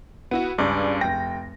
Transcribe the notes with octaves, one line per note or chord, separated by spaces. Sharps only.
B3 E4 F#4
C#2 G2 D4 D5
F1 G5 A#6